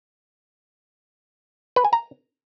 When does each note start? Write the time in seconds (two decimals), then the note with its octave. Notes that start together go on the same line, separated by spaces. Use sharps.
1.76 B4
1.85 G#5
1.93 A#5